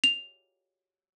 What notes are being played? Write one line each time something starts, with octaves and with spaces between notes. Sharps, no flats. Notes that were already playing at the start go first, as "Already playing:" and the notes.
F7